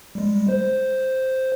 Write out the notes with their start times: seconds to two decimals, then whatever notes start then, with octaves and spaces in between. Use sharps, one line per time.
0.15 G3 G#3
0.49 C5